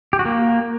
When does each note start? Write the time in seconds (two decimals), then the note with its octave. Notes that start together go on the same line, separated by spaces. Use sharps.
0.13 G4
0.19 F#4
0.25 A#3